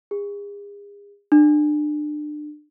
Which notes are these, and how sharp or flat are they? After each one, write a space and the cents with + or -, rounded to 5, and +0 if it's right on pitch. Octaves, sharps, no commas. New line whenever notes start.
G#4 -40
D4 +30